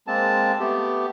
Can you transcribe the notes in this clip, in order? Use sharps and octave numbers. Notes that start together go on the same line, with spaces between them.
G#3 A#3 C4 A5
A3 B3 G4